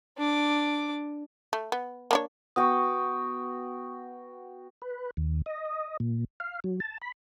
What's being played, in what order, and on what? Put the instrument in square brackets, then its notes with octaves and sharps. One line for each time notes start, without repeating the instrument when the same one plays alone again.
[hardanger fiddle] D4 D6
[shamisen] A3
B3
A#3 D4 C#5
[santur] B3 F#4 G5 [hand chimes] C#6 D#6
[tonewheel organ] B4
D#2
D#5
A#2
F5
F#3
A5
B5